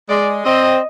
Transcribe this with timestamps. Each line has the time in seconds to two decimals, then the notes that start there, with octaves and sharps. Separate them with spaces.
0.09 G#3 D5
0.45 C4 D#5